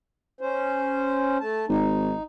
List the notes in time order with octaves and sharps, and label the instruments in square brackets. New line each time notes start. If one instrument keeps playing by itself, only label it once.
[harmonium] C#4 C5
A3 A5
[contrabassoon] G#1 [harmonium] D#4